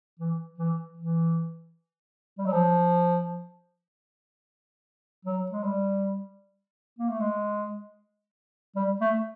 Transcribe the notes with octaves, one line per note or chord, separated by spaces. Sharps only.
E3
E3
E3
G3
F#3
F3
F#3
G#3
G3
A#3
A3
G#3
G3
A3